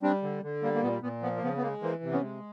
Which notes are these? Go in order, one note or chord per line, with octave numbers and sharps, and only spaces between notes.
G3 C4 D4
D3
D3
G3 A#3
A#3
A#2 B3
A#2 B3
F3 B3
A#3
C#3 B3
B3
G#3 A#3
E3 A#3 C4
C3
B3 C#4
G#3